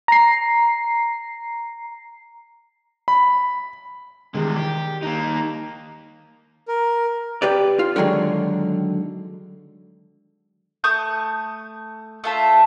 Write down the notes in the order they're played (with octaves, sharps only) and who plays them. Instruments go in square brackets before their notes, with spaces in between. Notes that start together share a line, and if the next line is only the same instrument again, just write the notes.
[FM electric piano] A#5 C7
[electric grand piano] B5
[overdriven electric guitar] E2 G#3 [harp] D#3 G3
[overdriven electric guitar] G4
[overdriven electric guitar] A#3 D#4 [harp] A5 F#6
[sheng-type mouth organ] A#4
[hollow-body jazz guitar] G4 B4 D5
F4
D3 D#3 F#3 G#3
[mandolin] A3 C#6 D#6 G6
A3 F4 A4 E5